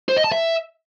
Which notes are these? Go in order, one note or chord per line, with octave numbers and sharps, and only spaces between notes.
C5
D#5
A5
E5